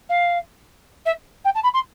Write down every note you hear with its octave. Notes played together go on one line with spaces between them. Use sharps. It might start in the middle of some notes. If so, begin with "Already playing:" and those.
F5
E5
G5
A5
B5
C6